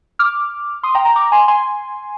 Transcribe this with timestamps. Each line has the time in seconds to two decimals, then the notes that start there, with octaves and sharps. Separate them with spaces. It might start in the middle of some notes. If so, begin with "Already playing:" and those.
0.19 D6 F6
0.83 C6 D#6
0.95 G5 A#5
1.05 G5 A#5
1.16 A#5 D6
1.32 G#5 C6
1.48 G#5 C6